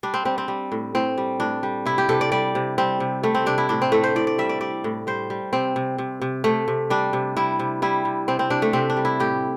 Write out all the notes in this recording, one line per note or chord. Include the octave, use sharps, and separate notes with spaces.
G3 D4
C4
G3 C4
C4
G3
A2
A2 C4
G3
A2 D4
G3
C3 E4
G4
C3 A4
D5
G3 D5
C3
G3 C4
C3
G3 A3
C4
C3 D4
E4
A2 D4
C4
A2 A3
C5
A2 D5
D5
G3 E5
D5
G3 D5
A2
G3 C5
G3
C3 C4
C3
C3
C3
C3 A3
C3
G3 D4
C3
G3 E4
C3
G3 E4
C3
C3 C4
C4
C3 D4
A3
C3 C4
D4
G3
E4
A2 G4